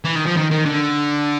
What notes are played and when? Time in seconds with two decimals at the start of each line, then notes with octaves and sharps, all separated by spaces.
0.05 E3
0.16 D#3
0.27 F3
0.37 D#3
0.52 D#3
0.66 D3